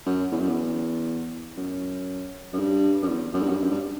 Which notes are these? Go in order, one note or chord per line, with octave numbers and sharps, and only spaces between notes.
F#2
E2
F#2
E2
F#2
F#2
G2
F#2
E2
F#2
G2
F#2
G2
F#2
G2